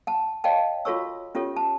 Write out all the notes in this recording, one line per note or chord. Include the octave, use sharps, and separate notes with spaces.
F#5 A5
C#5 D#5 F5 G5 A5
F4 F#4 A4 C#5 C#6 E6
C#4 F4 G4 A4 C#5
A5